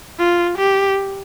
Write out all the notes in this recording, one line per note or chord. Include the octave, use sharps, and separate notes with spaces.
F4
G4